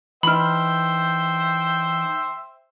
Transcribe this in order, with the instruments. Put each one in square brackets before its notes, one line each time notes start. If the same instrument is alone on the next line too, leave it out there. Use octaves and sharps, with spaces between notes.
[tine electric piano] E3 D#4 [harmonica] C5 E5 G5 [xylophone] B5 F6